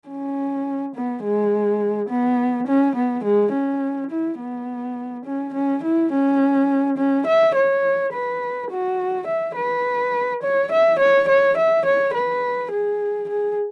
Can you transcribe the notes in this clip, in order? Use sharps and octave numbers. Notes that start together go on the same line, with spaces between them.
C#4
B3
G#3
B3
C#4
B3
G#3
C#4
E4
B3
C#4
C#4
E4
C#4
C#4
E5
C#5
B4
F#4
E5
B4
C#5
E5
C#5
C#5
E5
C#5
B4
G#4
G#4